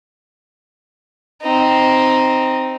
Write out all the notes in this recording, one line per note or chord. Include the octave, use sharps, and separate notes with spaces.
C4 D#4